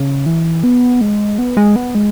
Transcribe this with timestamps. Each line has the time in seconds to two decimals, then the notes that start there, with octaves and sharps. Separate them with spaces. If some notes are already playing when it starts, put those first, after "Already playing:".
Already playing: C#3
0.26 E3
0.63 B3
1.01 G#3
1.38 B3
1.57 G#3
1.76 B3
1.95 G#3